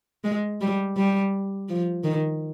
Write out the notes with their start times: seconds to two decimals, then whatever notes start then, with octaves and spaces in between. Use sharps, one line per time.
0.24 G#3
0.61 G3
0.96 G3
1.69 F3
2.04 D#3